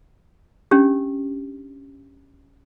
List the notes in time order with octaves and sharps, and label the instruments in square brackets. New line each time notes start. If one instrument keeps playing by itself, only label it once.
[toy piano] C#4 D4 G4